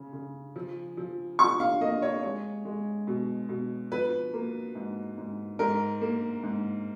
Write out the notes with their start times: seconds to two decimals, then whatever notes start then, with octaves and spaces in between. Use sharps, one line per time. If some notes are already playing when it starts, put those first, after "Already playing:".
Already playing: C#3
0.13 C#3
0.56 F3
0.97 F3
1.39 F3 C#6
1.60 F5
1.81 A#3 D#5
2.02 C#5
2.23 G#3 C#5
2.65 G#3
3.07 B2
3.49 B2
3.92 F3 B4
4.34 A#3
4.75 G#2
5.18 G#2
5.59 G#2 A#4
6.01 A#3
6.43 G#2